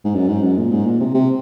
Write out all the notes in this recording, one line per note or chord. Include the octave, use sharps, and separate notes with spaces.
G#2
F#2
G#2
F#2
A#2
G#2
A#2
C3
C3